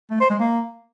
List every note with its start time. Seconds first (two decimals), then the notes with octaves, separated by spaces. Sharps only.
0.11 A3
0.20 C5
0.30 G#3
0.40 A#3